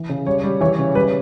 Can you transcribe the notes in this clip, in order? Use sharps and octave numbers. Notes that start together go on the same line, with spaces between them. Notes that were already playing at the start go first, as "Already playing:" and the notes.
Already playing: E3
C#3
G3 C#5
G3
E3 C#5
C#3
G3 B4